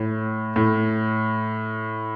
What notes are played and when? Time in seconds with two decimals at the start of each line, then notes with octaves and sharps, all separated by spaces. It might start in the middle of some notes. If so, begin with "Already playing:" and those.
Already playing: A2
0.56 A2